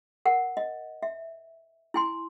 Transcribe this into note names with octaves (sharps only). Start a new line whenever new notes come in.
A#4 F#5
D#5
E5
E4 G#5 C6